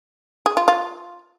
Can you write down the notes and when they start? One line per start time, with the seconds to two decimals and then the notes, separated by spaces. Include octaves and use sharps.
0.46 G#4
0.57 F4
0.68 F4